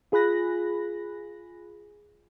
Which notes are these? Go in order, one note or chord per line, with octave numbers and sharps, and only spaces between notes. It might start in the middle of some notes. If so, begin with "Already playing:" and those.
F4 G#4 B5 F#6 A#6